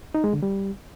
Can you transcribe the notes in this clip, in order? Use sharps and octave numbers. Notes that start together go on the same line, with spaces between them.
D#4
G#3
D3
G3